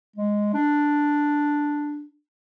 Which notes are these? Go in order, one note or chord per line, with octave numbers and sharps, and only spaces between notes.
G#3
D4